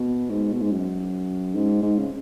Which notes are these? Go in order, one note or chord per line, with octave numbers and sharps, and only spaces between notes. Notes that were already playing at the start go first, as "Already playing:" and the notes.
Already playing: B2
G#2
B2
G#2
F#2
G#2
G#2
C#3